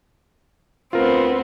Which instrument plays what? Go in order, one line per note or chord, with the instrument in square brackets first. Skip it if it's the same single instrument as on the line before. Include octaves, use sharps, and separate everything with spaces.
[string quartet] D2 B3 C4 [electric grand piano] F4 A#4